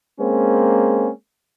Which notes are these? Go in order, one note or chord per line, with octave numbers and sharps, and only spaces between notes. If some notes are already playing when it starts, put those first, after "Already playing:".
G#3 A#3 C4 C#4